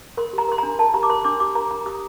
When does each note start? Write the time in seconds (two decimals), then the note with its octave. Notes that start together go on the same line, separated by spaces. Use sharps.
0.17 A#4 C6
0.33 G4
0.38 A#5
0.48 A#4 C6
0.58 D4 A#5
0.79 A#4 A5
0.94 G4 A#5
1.03 D6
1.09 A#4 C6
1.25 D4 D6
1.40 G4 D6
1.55 A#4 A#5
1.71 D4 A#5
1.86 G4 D#6